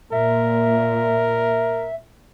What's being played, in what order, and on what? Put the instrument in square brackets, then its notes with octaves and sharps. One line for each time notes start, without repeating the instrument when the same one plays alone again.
[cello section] A#2 [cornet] A#4 [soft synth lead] E5